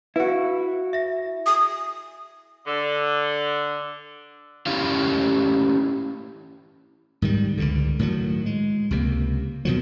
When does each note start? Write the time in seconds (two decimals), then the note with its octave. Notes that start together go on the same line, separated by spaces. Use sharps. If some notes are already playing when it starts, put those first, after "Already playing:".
0.16 E4 F#4 B4
0.28 F5
0.93 E5 A#6
1.46 D#6
2.66 D3
4.67 C#4 E4 G4 F5
7.22 G#2 D#3 G3
7.57 C#2 G2 D3
7.99 A2 D#3 F3 F#3
8.46 G#3
8.91 C#2 C3 E3 A#3
9.65 B2 D#3 F3 F#3